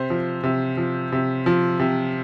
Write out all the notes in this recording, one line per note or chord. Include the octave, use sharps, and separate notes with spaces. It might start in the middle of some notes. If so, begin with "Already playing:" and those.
Already playing: C3 C5
F3
C3
F3
C3
F3
C3